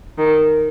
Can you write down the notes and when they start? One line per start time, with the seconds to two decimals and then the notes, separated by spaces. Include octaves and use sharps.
0.18 D#3